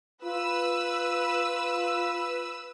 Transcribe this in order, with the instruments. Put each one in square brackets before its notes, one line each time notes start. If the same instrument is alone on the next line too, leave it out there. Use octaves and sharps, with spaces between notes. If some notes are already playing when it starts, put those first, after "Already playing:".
[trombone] F4 [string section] B4 E6